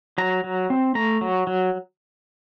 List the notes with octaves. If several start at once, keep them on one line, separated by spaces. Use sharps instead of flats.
F#3 A#5
F#3
C4
A3 A#5
F#3
F#3